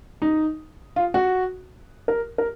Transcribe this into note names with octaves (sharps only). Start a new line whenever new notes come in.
D#4
F4
F#4
A#4
A#4